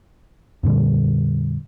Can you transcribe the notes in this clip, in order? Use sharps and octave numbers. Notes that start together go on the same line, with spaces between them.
F2 A#2 D3 G3